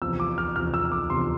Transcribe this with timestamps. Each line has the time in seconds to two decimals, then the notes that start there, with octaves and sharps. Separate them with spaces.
0.02 E2 C3 F3 E6
0.20 D6
0.38 F6
0.55 E2 C3 F3 F6
0.74 E6
0.92 D6
1.10 E2 C3 F3 C6